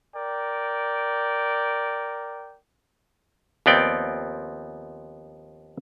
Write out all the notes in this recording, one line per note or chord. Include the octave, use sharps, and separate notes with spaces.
A#4 D5 G5
D#2 F3 B3 C4 D5 G5